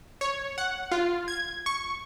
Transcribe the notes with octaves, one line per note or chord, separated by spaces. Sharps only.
C#5
F#5
F4
G#6
C#6